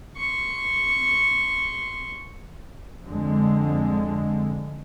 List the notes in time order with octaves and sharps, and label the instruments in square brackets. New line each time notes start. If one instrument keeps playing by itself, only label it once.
[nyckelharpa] C6 C#6
[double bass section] F2 D3 G#3